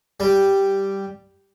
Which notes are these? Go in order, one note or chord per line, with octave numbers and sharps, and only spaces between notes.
G3